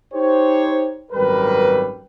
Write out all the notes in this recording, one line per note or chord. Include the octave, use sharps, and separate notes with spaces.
D#4 G4 C5 C#5
G#1 F#2 G3 A#4 B4